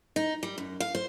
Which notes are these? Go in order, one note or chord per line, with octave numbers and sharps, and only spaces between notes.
D#4
G3
F#2
F5
C5